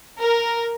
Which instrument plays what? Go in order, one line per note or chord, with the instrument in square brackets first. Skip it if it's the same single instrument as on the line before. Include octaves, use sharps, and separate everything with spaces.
[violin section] A#4